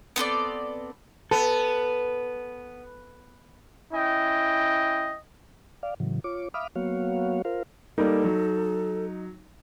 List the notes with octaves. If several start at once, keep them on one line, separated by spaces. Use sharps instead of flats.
B3 C4 A4 D5
B3 A4
C#4 E4 D#5 G5
D5 F5
A2 C#3 E3 F#3
F4 C#5 D6
E5 F5 B5 D6 D#6 F6
F#3 A#3 B3 F#4 C#5 F5
F4 A#4 C5 F5
G3 A#3 D#4 A4
F#3